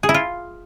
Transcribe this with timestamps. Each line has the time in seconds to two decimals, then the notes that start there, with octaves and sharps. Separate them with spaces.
0.03 G#4
0.09 E4
0.14 F4